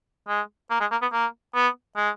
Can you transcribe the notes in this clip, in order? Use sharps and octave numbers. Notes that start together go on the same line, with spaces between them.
G#3
A#3
G#3
A#3
B3
A#3
B3
G#3